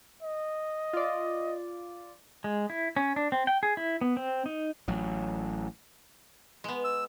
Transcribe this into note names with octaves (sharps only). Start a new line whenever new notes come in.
D#5
F4 D5
G#3
E4
C#4
D4
C4
G5
G#4
E4
B3
C4
D#4
A1 F#3
G#3 B3
E6